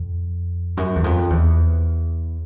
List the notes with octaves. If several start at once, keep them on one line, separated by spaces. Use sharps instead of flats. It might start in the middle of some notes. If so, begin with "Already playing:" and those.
Already playing: F2
F#2
E2
F2
E2